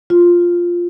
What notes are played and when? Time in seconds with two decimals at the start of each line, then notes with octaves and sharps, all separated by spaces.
0.10 F4